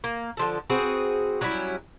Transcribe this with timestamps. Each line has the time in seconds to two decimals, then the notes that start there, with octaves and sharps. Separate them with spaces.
0.04 A#3
0.37 D3 F3 A4
0.70 C4 F#4 G#4 B4
1.41 F#3 G3 C#4 E4